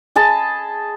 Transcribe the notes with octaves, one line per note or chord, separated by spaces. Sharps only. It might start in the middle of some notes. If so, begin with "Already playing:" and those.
G#4 D#5 A5 B5